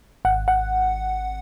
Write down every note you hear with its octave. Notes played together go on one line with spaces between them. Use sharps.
G#1 F#5
F#5